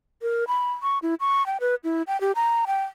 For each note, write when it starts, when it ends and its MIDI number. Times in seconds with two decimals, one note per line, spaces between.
0.22 0.44 70
0.48 0.72 83
0.82 0.99 85
1.03 1.15 64
1.20 1.46 85
1.46 1.58 79
1.60 1.75 71
1.84 2.02 64
2.07 2.20 79
2.21 2.32 67
2.35 2.65 82
2.67 2.83 79